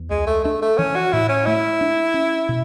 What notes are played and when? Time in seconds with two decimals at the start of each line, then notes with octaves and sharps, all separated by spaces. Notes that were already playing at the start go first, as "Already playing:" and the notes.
Already playing: E2
0.10 C#2 G#3
0.27 A3
0.44 A3 D4
0.62 A3
0.78 E3 C#4
0.96 F#4
1.13 A2 E4
1.29 C#4
1.46 A3 E4
1.81 D4
2.14 C#4
2.49 B2